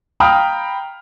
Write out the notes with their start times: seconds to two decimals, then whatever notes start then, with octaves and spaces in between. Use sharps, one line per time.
0.20 F5 G5 A#5 B5 D#6 F6